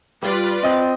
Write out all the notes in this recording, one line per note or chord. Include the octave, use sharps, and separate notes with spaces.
G3 F4 B4 D5
C4 D#5 D#6